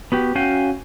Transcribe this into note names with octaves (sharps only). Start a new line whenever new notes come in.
B3 F#4 G4
C#4 F#4 F5 G5 G#5